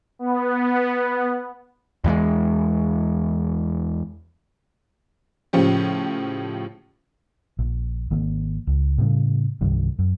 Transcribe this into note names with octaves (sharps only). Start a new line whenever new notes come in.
B3
E2 E3 F3 G#3
A2 C#3 F3 C#4 G4
A#1
G#1 D#3 A#3
C#2
A2 C#3 G3
C2 G2 D#3 G3
F#2